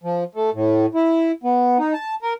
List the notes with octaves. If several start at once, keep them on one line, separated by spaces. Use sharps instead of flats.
F3
A3
A2
E4
B3
D#4
A5
A#4